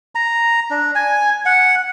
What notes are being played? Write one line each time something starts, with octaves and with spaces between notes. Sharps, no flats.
A#5
D4
G#5
F#5